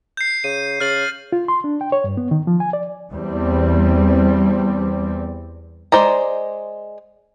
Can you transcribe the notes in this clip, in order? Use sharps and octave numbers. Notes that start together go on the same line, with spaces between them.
G6 C7
C#3 D#7
C#3 F6 A6 F#7
F4
C6
D4
G5
C#5
G2
B3
D#3
F3
G#5
D5
E2 G3 C4
G#3 C5 D5 A#5